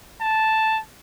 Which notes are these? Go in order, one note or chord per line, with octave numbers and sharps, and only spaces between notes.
A5